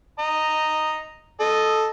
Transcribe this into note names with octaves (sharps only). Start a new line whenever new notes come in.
D#5 A#5
A4 D#5